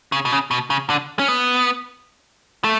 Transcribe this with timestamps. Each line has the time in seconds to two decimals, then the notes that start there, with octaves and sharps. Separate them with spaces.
0.12 C#3
0.25 B2
0.32 C#3
0.51 B2
0.70 C#3
0.90 D3
1.19 C#4
1.28 B3
2.64 A3